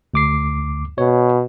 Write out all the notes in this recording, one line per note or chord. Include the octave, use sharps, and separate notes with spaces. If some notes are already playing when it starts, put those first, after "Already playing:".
D2 D6 C7
B2 C#5